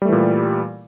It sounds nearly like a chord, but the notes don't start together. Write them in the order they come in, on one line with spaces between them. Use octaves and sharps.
G3 A3 E3 A#2